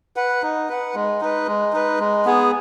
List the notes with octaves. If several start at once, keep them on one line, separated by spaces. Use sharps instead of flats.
B4 F#5
D#4
B4 F#5
G#3
D#4 B4
G#3
D#4 B4
G#3
B3 G#4